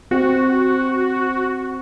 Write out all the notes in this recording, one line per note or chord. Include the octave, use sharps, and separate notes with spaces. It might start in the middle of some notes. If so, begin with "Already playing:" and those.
C4 F#4